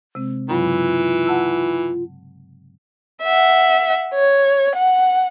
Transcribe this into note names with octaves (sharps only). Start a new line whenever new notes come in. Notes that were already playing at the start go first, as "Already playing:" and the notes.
C3 G#3 C4
G2 C#3 E3 F#3 F4
F#5 A5 E6
E5 F#5
C#5
F#5